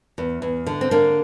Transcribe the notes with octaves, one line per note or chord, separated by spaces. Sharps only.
E2
E2
D3
C4
D3 A#3 D4